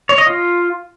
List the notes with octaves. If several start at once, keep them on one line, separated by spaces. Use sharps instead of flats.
C#5
D#5
F4